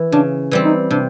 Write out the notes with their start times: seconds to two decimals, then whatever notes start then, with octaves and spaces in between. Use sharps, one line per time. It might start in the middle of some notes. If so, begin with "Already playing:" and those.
Already playing: E3
0.12 C#3 D4
0.51 E3 G3 C4
0.65 D#4
0.91 C3 D4